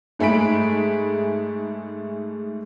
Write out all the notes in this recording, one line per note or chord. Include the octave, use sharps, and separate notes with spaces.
G#2 A3 G#4 B5 B6 D7